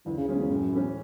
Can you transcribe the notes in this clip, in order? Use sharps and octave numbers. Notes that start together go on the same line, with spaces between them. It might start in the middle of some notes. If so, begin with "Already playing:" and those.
D2 E3
C#3
F#2 C#3 G#3 C#4 G#4
E2
F#2 A2
E3 A3 C#4